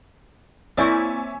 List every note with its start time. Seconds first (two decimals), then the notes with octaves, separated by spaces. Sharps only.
0.78 A#3 C4 E4 C#5 D5 E5 G#5 C#6